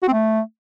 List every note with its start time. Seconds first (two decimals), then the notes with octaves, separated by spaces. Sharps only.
0.03 F#4
0.08 C4
0.13 A3